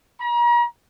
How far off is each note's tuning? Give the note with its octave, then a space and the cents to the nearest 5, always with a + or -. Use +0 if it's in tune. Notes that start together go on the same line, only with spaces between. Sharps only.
A#5 +40